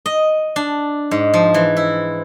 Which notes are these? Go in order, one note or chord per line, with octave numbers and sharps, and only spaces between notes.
D#5
D4
G#2
F3
E3
E4